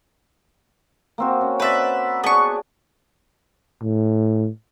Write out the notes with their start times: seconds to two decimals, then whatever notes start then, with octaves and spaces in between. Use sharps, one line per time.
1.18 A#3 C4 F#4
1.41 C#4
1.60 B4 C5 D5 E5
2.24 B3 D4 G#4 C#6
3.82 A2